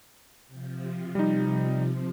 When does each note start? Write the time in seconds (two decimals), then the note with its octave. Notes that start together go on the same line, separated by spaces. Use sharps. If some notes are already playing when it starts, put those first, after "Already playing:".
0.48 C3 F3
1.15 G3 D#4